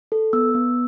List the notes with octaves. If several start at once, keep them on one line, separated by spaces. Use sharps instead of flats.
A4
B3 E6
B3